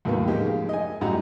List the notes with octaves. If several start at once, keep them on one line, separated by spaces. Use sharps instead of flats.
D#2 A2 D3 F#3 A#3 B3
C#3 F3 G#3 A#3 D#4 G4
D#5 G#5
F#2 A2 G3 D#4 F#4 A#5